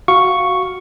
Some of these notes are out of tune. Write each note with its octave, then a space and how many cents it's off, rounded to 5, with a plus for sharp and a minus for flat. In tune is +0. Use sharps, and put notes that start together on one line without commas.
F#4 +0 F5 +0 C#6 +0